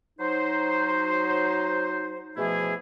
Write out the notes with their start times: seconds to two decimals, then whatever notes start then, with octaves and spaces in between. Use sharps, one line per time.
0.19 F#3 D#4 C5
2.36 B2 E3 F3 A3 E4 G#4